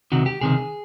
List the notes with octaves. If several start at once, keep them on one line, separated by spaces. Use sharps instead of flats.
C#2 C3 D#3 F#4
G4
C#2 C3 D#3 G#4